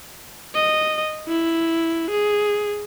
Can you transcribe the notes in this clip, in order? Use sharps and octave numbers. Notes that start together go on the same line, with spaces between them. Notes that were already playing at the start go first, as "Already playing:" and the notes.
D#5
E4
G#4